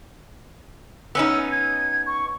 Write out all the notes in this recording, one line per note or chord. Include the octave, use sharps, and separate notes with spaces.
B3 C#4 D#4 E6
G#6
C#6